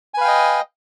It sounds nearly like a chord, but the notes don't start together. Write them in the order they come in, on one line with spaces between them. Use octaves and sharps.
G#5 B4 F5 G5 D#5